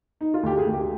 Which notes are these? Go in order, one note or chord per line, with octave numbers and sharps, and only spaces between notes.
D#4
F4
D2 G4
G#4
D2
G4